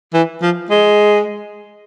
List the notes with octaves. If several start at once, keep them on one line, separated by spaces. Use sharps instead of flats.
E3
F3
G#3